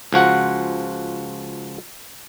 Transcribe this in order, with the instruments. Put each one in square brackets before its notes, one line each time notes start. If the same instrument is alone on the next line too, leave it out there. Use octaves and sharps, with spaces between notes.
[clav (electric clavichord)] C#2 F3 F#4 F#5